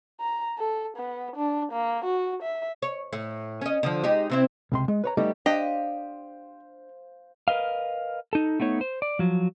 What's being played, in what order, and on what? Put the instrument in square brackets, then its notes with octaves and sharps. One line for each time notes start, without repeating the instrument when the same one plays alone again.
[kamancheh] A#5
A4
B3
D4
A#3
F#4
E5
[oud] C#5
A2
C#4 D#5
D3 F3
G#3 D#4 G4
C3 C4 E4
[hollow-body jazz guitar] C#2 C3 C6
G#3
B4 C#5 A#5
G3 A3 B3 D#4 G4 A4
[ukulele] D4 [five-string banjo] G4 D#5 [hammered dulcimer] C5 F5
[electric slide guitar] A#4 B4 D#5 F5
D#4 A4
A3 B3 D#4 C#5
C5
D5
F3 F#3